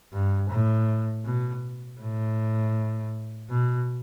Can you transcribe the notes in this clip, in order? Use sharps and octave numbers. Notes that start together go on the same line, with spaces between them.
G2
A2
B2
A2
B2